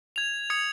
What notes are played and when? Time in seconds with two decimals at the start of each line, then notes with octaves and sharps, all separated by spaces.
0.16 G#6 F7
0.50 D#6 G#6 C#7 F7